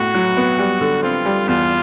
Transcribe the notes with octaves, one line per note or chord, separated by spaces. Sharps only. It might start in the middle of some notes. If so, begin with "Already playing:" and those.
Already playing: A2 B3 F#4
F#3
B3
G3
D3
C4 F4
G3
E2 F4